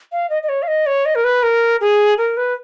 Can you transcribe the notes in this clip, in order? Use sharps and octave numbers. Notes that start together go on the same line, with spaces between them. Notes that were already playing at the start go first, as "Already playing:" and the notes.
F5
D#5
D#5
C#5
F5
D#5
C#5
D#5
A#4
B4
A#4
G#4
A#4
B4